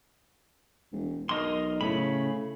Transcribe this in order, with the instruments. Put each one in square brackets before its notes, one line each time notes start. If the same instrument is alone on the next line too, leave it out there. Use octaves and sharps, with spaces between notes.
[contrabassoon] E1
[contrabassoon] B1 [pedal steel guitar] A#4 D#5 C6
[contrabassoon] A2 [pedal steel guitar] C#3 B5